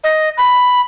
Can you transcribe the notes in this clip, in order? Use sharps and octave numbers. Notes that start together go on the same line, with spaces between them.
D#5
B5